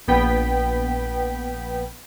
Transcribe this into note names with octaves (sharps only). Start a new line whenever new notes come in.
A#1 B3 G5 B5